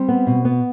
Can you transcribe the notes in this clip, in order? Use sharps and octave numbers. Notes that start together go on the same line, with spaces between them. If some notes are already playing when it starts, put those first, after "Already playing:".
Already playing: G3 C4
B3
B2
B3